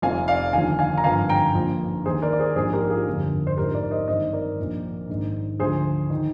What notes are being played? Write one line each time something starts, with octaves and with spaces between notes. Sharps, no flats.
F1 F2 C3 F3 F5 G#5
D5 F5
D#2 D3 F3 F5 G#5
F5 G#5
A#5
G#1 G2 D3 F3 F5 G#5
G5 A#5
A#1 A#2 F3
D#2 D#3 G#4 C5
A#4 D5
D5
G#4 C5
A#1 G#2 F3 G#4 C5
G4 A#4
F4 G#4
G1 F2 D3 F3
C5
A#1 G#2 F3 G4 A#4
A#4 D5
C5 D#5
G#1 G2 D#3 C5 D#5
A#4 D5
A#1 A#2 F3
A#1 G#2 D#3
D2 D3 F3 G#4 C5
D#3